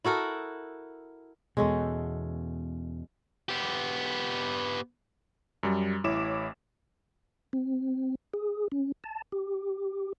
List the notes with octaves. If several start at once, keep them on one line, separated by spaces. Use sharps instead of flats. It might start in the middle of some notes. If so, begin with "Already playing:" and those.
E4 F#4 A4 A#4
E2 B2 G#3 C#4 A4
B3 G4
F#2 G3
A1 E4 C#5 D6 E7
C4
G#4
C#4
A5
G4